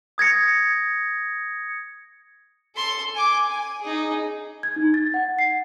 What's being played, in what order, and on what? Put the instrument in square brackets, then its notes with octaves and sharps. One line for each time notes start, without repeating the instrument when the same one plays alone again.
[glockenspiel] D#6 G#6 A#6 C#7
[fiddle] A4 C6
G#5 D6
G#5
D#4 G#4
[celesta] G#6
D#4
A6
F#5
C7